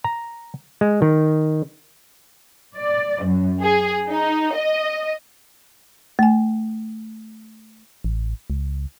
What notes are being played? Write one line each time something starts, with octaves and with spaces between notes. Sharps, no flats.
A#5
G#3
D#3
D5
F#2
G#4
D#4
D#5
A3 G#5
A1
C#2